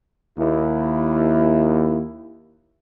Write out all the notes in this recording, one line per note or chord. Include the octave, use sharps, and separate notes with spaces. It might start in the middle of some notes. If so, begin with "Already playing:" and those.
D#2 E4